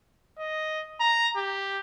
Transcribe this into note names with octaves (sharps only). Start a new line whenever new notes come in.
D#5
A#5
G4